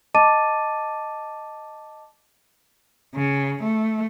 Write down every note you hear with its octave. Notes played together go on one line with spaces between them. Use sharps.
D#5 A5 D6 A6 D#7
C#3
A3